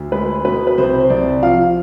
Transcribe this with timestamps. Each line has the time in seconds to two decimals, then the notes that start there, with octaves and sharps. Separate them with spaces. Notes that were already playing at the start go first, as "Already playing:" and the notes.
Already playing: D2
0.12 G#3 B4
0.45 B2 B4
0.67 B4
0.78 C2 C5
1.00 C5
1.10 C2 D5
1.43 F3 F5